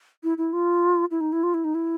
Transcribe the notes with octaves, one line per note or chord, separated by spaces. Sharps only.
E4
E4
F4
E4
D#4
E4
F4
E4
D#4
E4